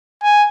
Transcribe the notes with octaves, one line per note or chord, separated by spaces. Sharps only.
G#5